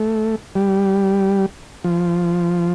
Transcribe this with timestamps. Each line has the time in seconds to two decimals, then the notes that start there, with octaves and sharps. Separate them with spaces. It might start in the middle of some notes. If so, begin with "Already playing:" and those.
Already playing: A3
0.55 G3
1.84 F3